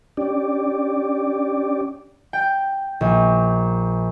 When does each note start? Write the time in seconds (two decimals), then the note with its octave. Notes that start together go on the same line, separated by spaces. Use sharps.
0.17 C#4 D4 G4 D5
2.33 G5
3.01 A#1